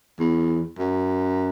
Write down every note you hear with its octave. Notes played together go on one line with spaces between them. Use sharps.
E2
F#2